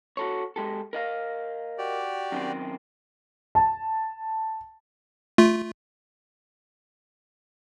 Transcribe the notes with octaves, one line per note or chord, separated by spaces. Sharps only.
F#4 A4 C#5
G#3 G4 A4
A#4 D#5 F5
F#4 G4 D5
F#2 D#3 C4
A5
A3 F4